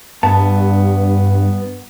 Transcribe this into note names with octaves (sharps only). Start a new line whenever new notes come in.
G2 B3 A5